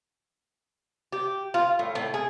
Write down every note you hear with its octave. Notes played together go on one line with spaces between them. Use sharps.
G4
F4
A2
A2
G#4